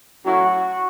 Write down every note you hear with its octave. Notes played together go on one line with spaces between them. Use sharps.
A2 F#3 C#4 E4 F#4